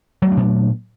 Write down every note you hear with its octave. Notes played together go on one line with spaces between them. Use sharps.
A#2 F#3 A3 D4